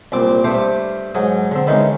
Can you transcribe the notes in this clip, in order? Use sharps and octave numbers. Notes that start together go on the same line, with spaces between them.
C2 A#2 C4 D6
G2 A3 C5 D6
G#2 F#3 G#5 D#6
D3 C4
D#3 E3 G#3 C#4 D#4